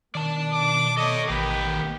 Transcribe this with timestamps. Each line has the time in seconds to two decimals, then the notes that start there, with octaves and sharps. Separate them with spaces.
0.15 B2 D#3 D5 A5
0.53 D6
0.97 A4 C#5 D#5
1.29 A1 D#3 A#3 G4 B4